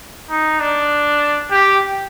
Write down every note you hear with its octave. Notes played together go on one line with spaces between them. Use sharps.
D#4
D4
G4